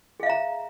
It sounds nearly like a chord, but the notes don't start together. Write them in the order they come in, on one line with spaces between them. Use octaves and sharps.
G#4 F5 E5 A#5